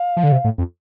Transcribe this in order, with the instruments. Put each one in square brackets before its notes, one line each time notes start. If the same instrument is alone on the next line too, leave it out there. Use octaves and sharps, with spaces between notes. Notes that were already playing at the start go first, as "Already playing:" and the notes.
Already playing: [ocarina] F5
[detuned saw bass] F3
D3
C3
A2
F2